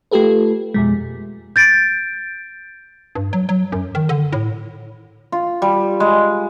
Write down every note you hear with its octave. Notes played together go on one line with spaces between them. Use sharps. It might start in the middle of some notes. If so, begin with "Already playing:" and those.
A3 F4 G4 A4 B4
F2 B2 G#3
G6 A6 D7
G2
F#3
F#3
F#2
D#3
D3
A2
F4
G3
G#3